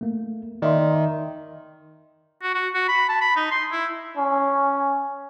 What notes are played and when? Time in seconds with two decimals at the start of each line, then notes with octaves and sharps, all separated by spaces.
0.01 A3 A#3
0.62 D#3 D5 E5 C6
2.43 F#4
2.55 F#4
2.75 F#4
2.88 B5
3.09 A5
3.21 B5
3.36 D#4
3.51 C6
3.72 E4
4.17 C#4